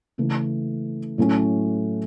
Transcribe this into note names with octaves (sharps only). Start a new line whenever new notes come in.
C#3 E3 A3
A2 F#3 A3 C#4